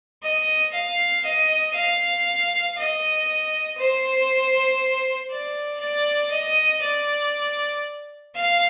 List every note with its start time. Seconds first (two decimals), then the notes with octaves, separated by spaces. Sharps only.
0.23 D#5
0.73 F5
1.25 D#5
1.75 F5
2.77 D#5
3.78 C5
5.30 D5
5.80 D5
6.31 D#5
6.82 D5
8.35 F5